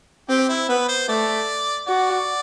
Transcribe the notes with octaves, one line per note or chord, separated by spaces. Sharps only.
C4 G4
E4
B3 B4
C5
A3 D5
F#4 D5